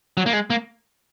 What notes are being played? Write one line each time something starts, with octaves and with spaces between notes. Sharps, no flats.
F#3
A#3
G#3
A#3